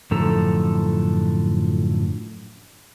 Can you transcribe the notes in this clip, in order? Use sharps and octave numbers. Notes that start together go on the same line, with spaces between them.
F#2 A2 D3 F3 A4 A#5